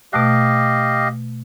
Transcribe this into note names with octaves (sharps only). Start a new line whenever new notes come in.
B2 A3 G4 D#5 F5 F#6